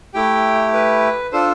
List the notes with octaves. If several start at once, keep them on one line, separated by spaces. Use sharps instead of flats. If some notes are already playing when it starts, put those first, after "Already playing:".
A3 E4 G4 G5
B4
D4 F4 A4 C5